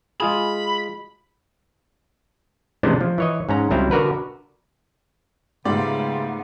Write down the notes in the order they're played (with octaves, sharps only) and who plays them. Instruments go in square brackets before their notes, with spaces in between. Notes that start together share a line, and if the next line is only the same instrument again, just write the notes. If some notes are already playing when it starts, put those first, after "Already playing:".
[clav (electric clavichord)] G#3 F4 G#4 [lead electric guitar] B5
[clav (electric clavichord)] C3 E3 G#3 A3 C#4 D4
F3
E3 C#5 D#5
G#2 C#4 A#5
C#2 F#3 G3 C4 E4 A#5
D3 F#4 A#4 B4
[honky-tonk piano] G#2 A3 [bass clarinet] C#3 [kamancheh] B3 [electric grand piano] F4 G4 D5